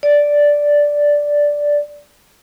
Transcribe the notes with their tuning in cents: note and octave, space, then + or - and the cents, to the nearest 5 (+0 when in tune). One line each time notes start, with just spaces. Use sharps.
D5 -5